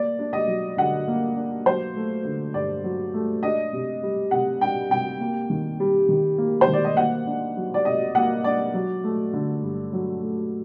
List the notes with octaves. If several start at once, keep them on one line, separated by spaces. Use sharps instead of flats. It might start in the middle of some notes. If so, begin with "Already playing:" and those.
Already playing: A#3 D5
D4
D#5
F#3
D3 F#5
A#3
D4
F#3 C5
A3
D3
G2 D5
F#3
A3
D4 D#5
C3
G3
C3 F#5
D4 G5
C3 G5
A#3
D#3
G3
D#3
A#3
C5
D#3
D5
D#5
A#3 F#5
D4
F#3
D5
C3 D#5
A#3 F#5
D4 D5
F#3
A3
D3
G2
F#3
A3